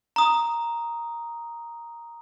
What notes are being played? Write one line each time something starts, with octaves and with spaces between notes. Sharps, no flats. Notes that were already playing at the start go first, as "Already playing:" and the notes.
A#5 D#6